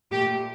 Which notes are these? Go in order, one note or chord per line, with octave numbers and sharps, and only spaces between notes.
A#2 A3 G4